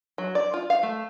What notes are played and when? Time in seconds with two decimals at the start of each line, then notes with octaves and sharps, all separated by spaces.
0.18 F#3
0.35 D5
0.54 F4
0.70 F5
0.83 A3